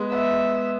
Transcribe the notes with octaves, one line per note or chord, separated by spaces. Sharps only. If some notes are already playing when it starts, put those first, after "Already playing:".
Already playing: G#3 B3
B3 E5